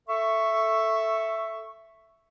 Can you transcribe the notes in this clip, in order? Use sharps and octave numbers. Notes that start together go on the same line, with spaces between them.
A4 E5 C#6